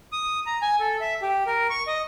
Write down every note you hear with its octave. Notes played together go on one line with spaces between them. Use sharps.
D#6
A#5
G#5
A4
E5
G4
A#4
C#6
D#5